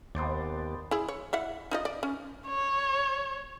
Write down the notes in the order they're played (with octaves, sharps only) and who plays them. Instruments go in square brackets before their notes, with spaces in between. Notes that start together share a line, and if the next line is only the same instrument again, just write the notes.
[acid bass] D#2 [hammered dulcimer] B3 C5 D5
[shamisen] E4 G#4
C#5
E4 E5 F#5
D#4 F4 D#5
D5
C#4
[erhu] C#5